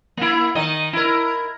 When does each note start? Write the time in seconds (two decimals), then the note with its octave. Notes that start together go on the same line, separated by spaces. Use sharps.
0.17 A#3 E4
0.55 D#3 D#4 D#5
0.93 E4 A#4